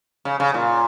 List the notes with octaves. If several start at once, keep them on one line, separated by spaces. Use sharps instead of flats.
C#3
C#3
A#2